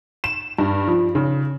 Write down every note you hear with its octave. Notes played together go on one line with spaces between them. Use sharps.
E7
G2
F3
C#3